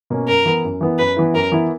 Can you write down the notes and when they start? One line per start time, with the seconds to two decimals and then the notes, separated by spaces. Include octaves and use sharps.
0.10 B2 A#3 C#4
0.28 F#2 A#4
0.45 E3 B3 E4
0.64 F#2
0.81 E3 B3 E4
0.98 F#2 B4
1.17 E3 B3 E4
1.34 F#2 A#4
1.52 E3 B3 E4